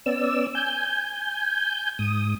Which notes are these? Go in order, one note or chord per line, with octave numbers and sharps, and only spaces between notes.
B3 C#4 D5 E6
G#5 G6
G#2 D#6